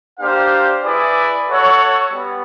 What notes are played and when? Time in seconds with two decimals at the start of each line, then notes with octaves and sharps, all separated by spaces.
0.19 A#3 D4 G4 C5 F5
0.83 E4 G#4 B4 D5
1.47 F#4 A4 C#5 E5
2.11 G3 B3